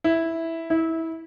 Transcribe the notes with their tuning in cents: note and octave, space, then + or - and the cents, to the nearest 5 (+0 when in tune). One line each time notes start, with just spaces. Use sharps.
E4 -5
E4 -20